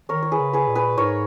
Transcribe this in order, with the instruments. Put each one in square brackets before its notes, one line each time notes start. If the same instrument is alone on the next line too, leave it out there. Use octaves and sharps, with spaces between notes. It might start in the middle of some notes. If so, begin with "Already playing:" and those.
[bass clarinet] D#3 [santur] A#4 C#5
[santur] C#5
G#4 B4
[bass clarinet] C#3
[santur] G#4 B4
[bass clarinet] A#2
[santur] G#4 B4
[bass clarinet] G#2 [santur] A#4 C#5